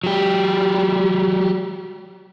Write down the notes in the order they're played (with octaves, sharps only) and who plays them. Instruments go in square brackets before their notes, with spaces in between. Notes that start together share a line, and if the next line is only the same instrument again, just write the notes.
[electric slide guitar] F#3 G4